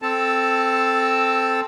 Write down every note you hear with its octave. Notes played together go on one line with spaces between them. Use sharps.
C4 A4 A5